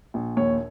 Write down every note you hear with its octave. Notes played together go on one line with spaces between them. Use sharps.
A#1
D#2 C#5